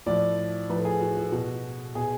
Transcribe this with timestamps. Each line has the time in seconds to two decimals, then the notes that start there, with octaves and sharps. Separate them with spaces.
0.06 A2 F3 D5
0.69 A2 F3 B4
0.78 A4
0.85 G#4
1.01 F#4
1.17 F#4
1.32 B2 F#4
1.95 B2 G#4